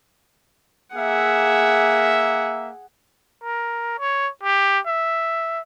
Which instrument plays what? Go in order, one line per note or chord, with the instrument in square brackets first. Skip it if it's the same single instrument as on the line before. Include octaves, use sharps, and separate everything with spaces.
[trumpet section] A#3 E5 [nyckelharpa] G#4 F#5
[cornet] A#4
C#5
G4
E5